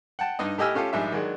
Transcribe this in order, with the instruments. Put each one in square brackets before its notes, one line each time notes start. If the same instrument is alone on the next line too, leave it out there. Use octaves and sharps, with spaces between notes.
[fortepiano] F#5 G5 A5
G2 D#4 D#5
A2 G4 D#5 G#5 E6 F6
A3 C#4 F4 G4 A4
A#1 G#2 G3 D4 E5
D#3 F#3 G#3 D4